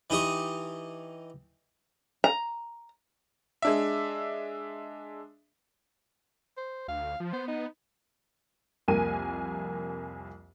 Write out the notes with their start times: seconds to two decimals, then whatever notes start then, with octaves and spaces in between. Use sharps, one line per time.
0.10 E3 D#4 G4 D#5 C#6
2.24 A#5
3.62 G#3 D4 E5
6.57 C5
6.88 D2 F5
7.20 F3
7.33 B3 C5
7.48 D#4
8.88 C2 F2 A#3 A#4 G#5 D#7